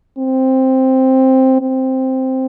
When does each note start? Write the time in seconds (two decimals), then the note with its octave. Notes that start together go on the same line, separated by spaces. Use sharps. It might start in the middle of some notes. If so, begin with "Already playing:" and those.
0.18 C4
1.61 C4